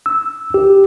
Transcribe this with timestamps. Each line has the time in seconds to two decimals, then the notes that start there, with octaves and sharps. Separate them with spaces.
0.06 E6
0.54 G4